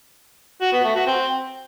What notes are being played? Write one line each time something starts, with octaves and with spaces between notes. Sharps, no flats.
F#4
B3
A3
F#4
C4